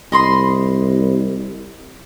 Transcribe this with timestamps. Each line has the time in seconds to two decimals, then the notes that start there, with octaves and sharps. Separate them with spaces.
0.12 C2 D#5 B5 C6